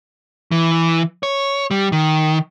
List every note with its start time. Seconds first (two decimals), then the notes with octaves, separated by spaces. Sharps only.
0.51 E3
1.23 C#5
1.71 G3
1.92 D#3